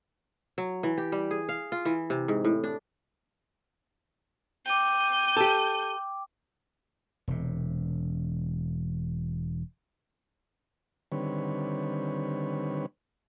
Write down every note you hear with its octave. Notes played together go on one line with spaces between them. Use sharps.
F#3
E3
G4
G3
G#4
F5
F4
E3
C3
G#2
A2
D4
G5 D6 G6 D#7
G4 A4
E1 C3
D3 D#3 G3 C4 B4 C#5